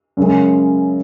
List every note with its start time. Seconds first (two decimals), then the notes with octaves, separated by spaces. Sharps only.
0.17 F#2 C#3 G#3